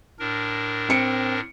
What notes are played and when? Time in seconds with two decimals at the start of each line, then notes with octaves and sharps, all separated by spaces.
0.19 A2 D4 A#4
0.89 C4 C#7 D7